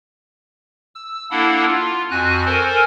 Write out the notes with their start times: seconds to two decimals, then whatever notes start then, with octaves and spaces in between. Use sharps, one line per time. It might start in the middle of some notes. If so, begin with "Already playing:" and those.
0.95 E6
1.31 A#3 D4 E4 A4 F#5
1.66 F4
2.11 F2 F#4 G#5 F#6
2.45 A4 A#4 C5 G#5